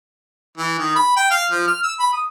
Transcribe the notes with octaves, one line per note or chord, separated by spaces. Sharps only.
E3
D#3
B5
G5
F5
F3
F6
E6
B5
D#6